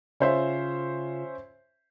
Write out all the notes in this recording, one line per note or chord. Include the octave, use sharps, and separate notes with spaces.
C#3 C#4 F4 C5 E5